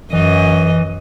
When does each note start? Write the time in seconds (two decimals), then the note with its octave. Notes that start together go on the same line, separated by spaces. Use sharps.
0.13 F#2 E3 D#5